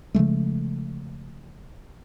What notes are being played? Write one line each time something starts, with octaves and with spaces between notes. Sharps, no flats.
C#3 F3 G#3 A3